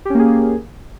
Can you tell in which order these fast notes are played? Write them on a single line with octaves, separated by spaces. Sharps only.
G4 C#4 A#3 G#4